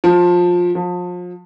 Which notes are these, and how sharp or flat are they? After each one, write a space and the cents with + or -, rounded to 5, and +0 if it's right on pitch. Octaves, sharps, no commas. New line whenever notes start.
F3 +20
F3 +35